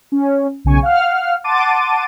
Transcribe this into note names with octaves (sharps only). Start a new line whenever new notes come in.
C#4
B1 C#3 G#5 C#6
F5 F#5 F6
F#5 A5 C6 D6 A6 D#7